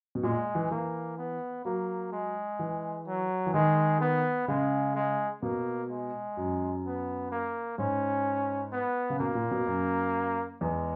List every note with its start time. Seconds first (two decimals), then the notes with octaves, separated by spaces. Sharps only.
0.15 B2
0.23 A#2 G#3
0.55 E3
0.71 E3 A#3
1.18 B3
1.65 F#3 A#3
2.12 G#3
2.59 E3
3.07 F#3
3.46 E3
3.54 D#3 G#3
4.01 B3
4.48 C#3 G#3
4.95 G#3
5.42 B2 A#3
5.90 G#3
6.37 F#2
6.84 B3
7.31 A#3
7.78 G#2 C#4
8.72 B3
9.10 C#3
9.19 B2 A#3
9.35 A#2
9.51 B2
9.67 F#2
10.61 E2 G#3